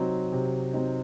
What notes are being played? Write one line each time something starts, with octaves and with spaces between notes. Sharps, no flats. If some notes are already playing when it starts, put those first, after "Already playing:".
Already playing: C3 F#3 C4 D#4
C3
F#3 C4 D#4